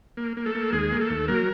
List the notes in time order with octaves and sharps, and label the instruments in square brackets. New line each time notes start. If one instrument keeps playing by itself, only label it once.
[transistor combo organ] A#3
A#3
A3 A4
A#3
D#2 G#3 G#4
A#3
A3 A4
D#2
F#3 A#3 A#4